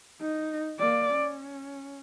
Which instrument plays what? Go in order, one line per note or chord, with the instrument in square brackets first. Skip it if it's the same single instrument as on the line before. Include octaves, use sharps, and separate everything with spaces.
[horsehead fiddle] D#4
A#3 D5
C#4